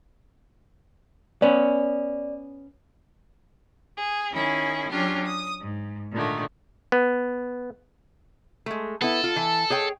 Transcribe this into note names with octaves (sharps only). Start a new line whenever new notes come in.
B3 C#4 D5
G#4
D#3 C#4 E4 G#4
F#3 C#4 D4 F4 G4
D#6
G#2
A#2 D3 D#3 A3
B3
G#3 A3
B3 E4 A4
F4
E3
G#4 C#5 G5